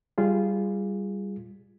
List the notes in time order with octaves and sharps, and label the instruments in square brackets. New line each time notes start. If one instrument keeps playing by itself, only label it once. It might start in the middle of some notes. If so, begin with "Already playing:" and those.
[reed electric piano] G3 F4 G#4